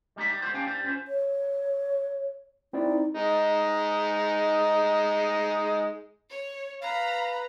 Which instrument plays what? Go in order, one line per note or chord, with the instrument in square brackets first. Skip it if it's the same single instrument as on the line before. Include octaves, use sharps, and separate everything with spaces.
[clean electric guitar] G3 G#3 D#4 E4 E5
G3
D3 G#3 B3 F4 C5
C#4 D4 G4 F5 G5 G#5
G3 D4 C5
C#4 F4 C5
[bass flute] C#5
[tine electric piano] C4 E4 D5 [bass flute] D#4
[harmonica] G#3 D#4
[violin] C#5
[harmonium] B4 [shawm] F5 [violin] A#5 B5